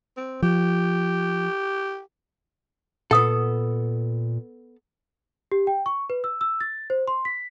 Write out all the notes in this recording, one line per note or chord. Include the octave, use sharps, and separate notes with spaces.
C4
F3 G4
A#2 B3 A4 F#5 D#6
G4
G5
C#6
B4
E6
E6
A6
C5
C6
B6